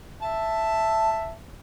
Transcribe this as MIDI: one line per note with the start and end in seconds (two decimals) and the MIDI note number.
0.22 1.31 76
0.22 1.31 81